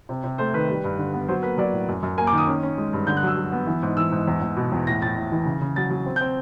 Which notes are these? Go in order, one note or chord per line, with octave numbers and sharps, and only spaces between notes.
C3
C3
A3 C5
D#3 B4
G3
G2
D3
B3
F#3 C5
A#3 B4
F#3 D5
A2
F#2
F#2
A#3 G#5
D6
D#3
D#6
C#4
C#4
G#3
G2
D3 G6
F#6
F#3 E6
F#3
B3
E3
G#2
E3 E6
G#2
E2
E2
B2
E2
A2 A#6
A2 A6
A2
E3
C#3
C#3
F#3 A6
F#3
C4
G6
C4